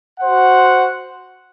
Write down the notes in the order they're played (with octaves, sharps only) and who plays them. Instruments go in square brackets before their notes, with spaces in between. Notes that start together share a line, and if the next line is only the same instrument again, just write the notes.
[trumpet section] F#4 C5 F#5